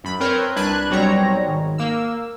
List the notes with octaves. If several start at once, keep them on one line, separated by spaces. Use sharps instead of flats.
F#2 B5
C4 A#4 B4 C#5 G6
C2 D4 B4 F#6 G#6
B1 G3 C4 F#4 C#5 A#5
G#1
A#3 E6